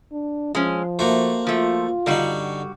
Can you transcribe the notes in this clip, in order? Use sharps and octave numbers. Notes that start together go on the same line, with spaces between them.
D4
F3 G#3 C#4
A3 A#3 F#4 C5
F3 A3 F4
G2 D3 G3 D#4 F#4